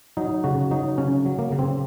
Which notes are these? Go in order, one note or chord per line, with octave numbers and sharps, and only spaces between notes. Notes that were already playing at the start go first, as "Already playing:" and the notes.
F#3 D#4
C#3 F#4
F#3 D#4
C#3 C#4
F#3
A#3
C#3
C4